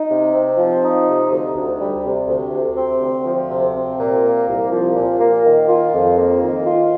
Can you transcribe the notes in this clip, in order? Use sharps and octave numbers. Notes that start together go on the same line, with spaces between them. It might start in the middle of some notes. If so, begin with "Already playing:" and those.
Already playing: D#4
C3
C4
F3
D#4
C3
D2
D2
G3
C3
D2
C3
C4
D2
F3
C3
C4
A#2
A#3
C2
F3
A#2
A#3
D#3
F4
F2
A#3
D#3
F4